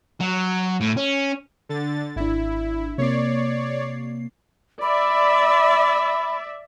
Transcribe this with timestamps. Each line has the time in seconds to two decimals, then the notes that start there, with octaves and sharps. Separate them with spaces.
0.20 F#3
0.81 A2
0.97 C#4
1.69 D3 A6
2.16 G#1 D4 E4
2.98 C3 A#3 C#5 D5 C7
4.82 D5 E5 B5